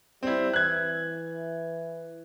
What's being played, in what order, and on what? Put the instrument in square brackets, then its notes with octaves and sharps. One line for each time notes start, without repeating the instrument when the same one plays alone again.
[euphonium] G3 [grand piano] C4 E4
[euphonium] E3 [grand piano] F#6 G#6